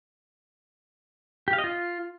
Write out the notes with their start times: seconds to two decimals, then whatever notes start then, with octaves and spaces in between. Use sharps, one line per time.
1.48 G4
1.53 F5
1.58 D#5
1.64 F4